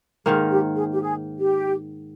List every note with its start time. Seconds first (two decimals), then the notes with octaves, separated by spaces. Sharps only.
0.25 G#2 D#3 A#3 G#4
0.50 G4
0.76 G#4
0.93 G4
1.01 G#4
1.39 G4